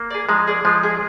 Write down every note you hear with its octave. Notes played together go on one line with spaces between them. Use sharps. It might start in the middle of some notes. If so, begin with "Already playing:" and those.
Already playing: A#3
G#4 D5
F3 G#3 D#4
G#4 D5
F3 G#3 F4
G#4 D#5